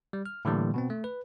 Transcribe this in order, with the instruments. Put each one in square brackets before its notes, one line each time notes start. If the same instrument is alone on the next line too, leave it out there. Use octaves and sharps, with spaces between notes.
[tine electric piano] G3
F6
A2 D3 E3 G3 A#3
B2 B3 C4
A3
B4